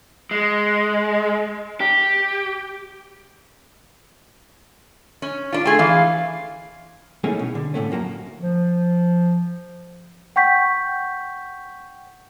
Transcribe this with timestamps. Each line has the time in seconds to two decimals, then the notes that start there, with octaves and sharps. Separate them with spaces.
0.31 G#3
1.81 G4
5.22 C#4
5.53 D4 F4
5.66 A3 G#4 C6
5.79 E3 F5
7.24 A3 A#3 C#4 D#4 E4 G#4
7.39 B2
7.55 D3
7.74 A2 D3 A3 C#4
7.91 F#2 A#3 F#4 G#4 A#5
8.40 F3
10.36 F#5 G5 C#6 G6 B6